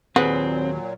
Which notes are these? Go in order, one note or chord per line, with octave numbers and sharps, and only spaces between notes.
D#2 A#2 F#3 C4 G#4 B4 F#5